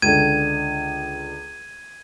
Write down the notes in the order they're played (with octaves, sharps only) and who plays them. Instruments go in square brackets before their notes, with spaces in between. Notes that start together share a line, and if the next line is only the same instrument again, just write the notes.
[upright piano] C#2 D3 [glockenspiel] G#6 D#7